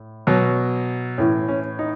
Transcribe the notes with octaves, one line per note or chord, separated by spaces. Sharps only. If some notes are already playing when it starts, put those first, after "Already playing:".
Already playing: A2
B2 F#3
A2 E3 C#4
C#4
D#4